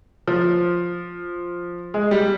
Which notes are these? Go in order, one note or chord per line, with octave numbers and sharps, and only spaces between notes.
F3
G#3
G3